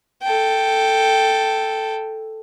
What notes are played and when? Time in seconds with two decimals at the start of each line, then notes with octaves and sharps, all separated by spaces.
0.23 A4 G5